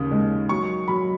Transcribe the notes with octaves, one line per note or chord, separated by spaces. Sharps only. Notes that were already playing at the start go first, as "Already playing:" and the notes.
Already playing: D#2 C#3 D#6
G#3
F#3 C#6
F#3 B5